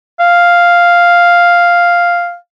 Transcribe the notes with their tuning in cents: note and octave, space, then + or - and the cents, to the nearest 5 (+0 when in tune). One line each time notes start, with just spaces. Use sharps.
F5 +0